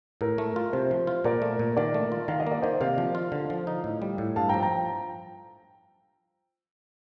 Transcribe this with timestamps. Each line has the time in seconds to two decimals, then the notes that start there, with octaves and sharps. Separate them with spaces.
0.21 A2 A#4
0.38 A3
0.56 F4
0.73 C3 C5
0.91 F3
1.07 F4
1.24 A#2 A#4 D5
1.42 A3
1.59 A#2
1.77 D#3 A#4 D5
1.94 A3
2.12 F4
2.28 D#3 F5
2.40 D#5
2.47 A#3 D5
2.62 D#3 C5 D#5
2.81 C3 D5 F5
2.98 F3
3.15 F4
3.32 D3
3.50 F3
3.67 D#4
3.84 A2
4.02 G3
4.18 A2
4.36 G2 F5 A5
4.49 G5 A#5
4.54 F3
4.62 G5 A#5